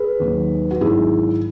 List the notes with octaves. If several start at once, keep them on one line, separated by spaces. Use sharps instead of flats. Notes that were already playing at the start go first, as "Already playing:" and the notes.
Already playing: G#4 B4
D#2 D#3 F#3
F#4
G#1 G#2 D#3 F#3 E4 G#4